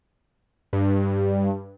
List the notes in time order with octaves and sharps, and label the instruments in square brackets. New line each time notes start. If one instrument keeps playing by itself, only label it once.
[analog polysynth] G2